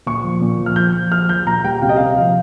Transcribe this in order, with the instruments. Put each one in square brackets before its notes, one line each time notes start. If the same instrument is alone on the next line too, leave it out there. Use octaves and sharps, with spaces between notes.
[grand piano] A#2 C#6
F3
A#2
F3
F6
F3 G6
F3
F3 F6
F3 G6
A#2 A#5
G3 G5
C3 F5
D#5
C3 F5
F3